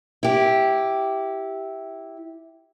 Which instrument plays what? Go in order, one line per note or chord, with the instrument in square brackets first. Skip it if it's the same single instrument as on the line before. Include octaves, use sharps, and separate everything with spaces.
[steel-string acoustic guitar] E4 G4